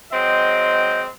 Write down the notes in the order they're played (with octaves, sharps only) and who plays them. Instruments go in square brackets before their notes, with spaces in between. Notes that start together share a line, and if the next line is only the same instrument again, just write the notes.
[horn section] F#3 G#3 C4 D#5 G5